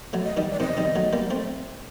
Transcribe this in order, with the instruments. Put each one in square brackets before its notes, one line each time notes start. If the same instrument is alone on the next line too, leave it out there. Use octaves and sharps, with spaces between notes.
[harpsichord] F#3 A3
[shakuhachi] D#5
[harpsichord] D#3 G3
[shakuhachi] D5
[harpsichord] C3 D#3 [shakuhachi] D#5
[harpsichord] D#3 G3
F#3 A3
G3 A#3
A3 C4